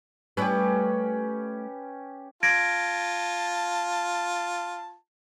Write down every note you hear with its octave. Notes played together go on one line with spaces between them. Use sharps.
G3 A3 C#4 E4 G4 B4
F4 A5 G#6 A#6 D7